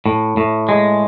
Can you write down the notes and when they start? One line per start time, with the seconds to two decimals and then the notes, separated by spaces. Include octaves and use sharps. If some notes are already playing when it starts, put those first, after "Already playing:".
0.06 A2
0.37 A2
0.69 G#3